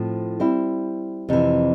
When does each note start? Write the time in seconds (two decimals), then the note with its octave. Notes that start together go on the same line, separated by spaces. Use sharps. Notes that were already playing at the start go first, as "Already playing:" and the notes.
Already playing: A2 F3 C4
0.40 G3 C4 E4
1.29 F2 C3 E3